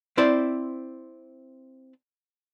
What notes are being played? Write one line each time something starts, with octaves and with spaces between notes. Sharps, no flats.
C4 E4 C5 D5